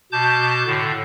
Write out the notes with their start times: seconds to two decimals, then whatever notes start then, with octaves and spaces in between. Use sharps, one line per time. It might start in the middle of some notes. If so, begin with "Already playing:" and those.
0.12 B2 A5 D6 G6
0.67 A2 D3